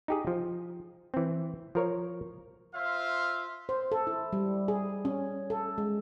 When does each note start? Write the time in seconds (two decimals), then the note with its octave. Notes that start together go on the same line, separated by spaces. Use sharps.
0.08 D#4 G4 G#4
0.27 F3
1.14 E3 C4
1.75 F3 A#4 C#5
2.75 F4 C5 E5 F5
3.69 C5
3.92 A4
4.07 E4
4.33 G3
4.68 G#4
5.05 C#4
5.50 A4
5.78 G#3